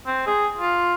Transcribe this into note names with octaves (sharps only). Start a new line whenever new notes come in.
C4
G#4
F4